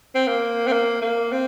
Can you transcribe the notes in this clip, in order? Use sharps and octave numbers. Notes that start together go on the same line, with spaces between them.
C4
A#3
C4
A#3
A#3
C4